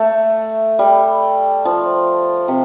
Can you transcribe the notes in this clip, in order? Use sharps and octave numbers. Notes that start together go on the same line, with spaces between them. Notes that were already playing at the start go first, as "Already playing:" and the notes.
Already playing: A3
G3
F3
C3